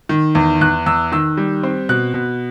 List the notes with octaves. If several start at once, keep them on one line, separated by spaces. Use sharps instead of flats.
D#3
E2
E2 F#6
E2 E6
D#3 E6
G3
C4
B2 F#6
B2